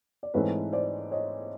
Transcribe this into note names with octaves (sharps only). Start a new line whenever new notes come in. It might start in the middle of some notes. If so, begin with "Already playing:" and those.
D5
G#2 E3 A3 C4 B4 C#5
C5 D5
C#5 D#5